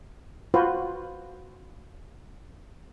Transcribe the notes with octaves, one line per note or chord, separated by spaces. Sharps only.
F4 F#4 B4 C5